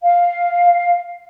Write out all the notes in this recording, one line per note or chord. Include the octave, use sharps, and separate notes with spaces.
F5